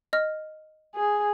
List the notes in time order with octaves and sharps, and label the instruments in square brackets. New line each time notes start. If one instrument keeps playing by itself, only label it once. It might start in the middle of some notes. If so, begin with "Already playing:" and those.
[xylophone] D#5 F6
[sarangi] G#4